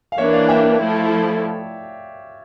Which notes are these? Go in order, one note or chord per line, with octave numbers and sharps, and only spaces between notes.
F5
E3 A#3 D4 C#5 E5
D5 F5
E5 G5
F3 A3 E4 A4